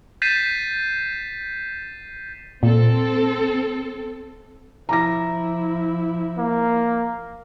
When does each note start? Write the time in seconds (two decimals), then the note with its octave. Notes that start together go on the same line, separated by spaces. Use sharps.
0.22 G6 A6 B6 C7 D#7 E7
2.63 A#2 C4 A4
4.89 F3 E4 A#5 D6 A#6
6.38 A#3